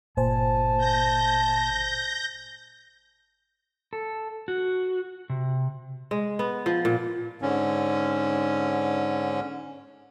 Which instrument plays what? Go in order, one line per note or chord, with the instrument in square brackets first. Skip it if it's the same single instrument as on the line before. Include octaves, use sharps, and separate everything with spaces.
[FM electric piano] G1 C5 G#5 [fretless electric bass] A#2 [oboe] A5
[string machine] G6 A#6
[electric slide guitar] A4
F#4
C3
[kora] G#3
B3
F3
A#2
[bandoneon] G#2 D3 C#4